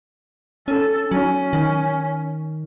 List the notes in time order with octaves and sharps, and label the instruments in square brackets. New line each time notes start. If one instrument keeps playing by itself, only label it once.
[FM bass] C#4 [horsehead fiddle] A4
[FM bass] F#3 [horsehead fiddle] C#4
[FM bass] D#3